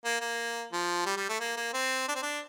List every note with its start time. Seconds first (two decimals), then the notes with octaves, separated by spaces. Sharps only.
0.05 A#3
0.21 A#3
0.73 F3
1.06 G3
1.17 G3
1.29 A3
1.40 A#3
1.57 A#3
1.74 C4
2.08 D4
2.15 C4
2.22 D4